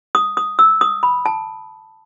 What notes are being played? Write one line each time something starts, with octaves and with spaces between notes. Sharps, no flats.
D#6
D#6
E6
D#6
B5
A5